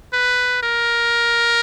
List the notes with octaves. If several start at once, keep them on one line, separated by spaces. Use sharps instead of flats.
B4
A#4